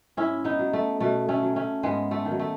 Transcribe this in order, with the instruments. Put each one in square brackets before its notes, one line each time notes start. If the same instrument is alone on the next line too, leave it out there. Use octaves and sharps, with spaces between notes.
[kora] G#2 C#4 E4
B3 D#4
F#3
A3
B2 A3
A3 C#4
F#3
A3 C#4
G#2 G#3 B3
A3
D#3
F#3
A3